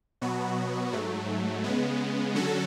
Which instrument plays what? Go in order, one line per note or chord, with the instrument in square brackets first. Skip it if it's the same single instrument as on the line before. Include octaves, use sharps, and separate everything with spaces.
[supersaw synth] B2 F#3 B3 F#4
G#2 F#3 A3
C#3 G#3 B3
D3 F#3 C#4 F#4 A4